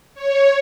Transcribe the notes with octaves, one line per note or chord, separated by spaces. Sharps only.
C#5